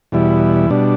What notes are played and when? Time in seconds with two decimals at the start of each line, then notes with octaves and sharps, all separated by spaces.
0.12 E2 B2 G3 E4
0.70 B2 G3 D4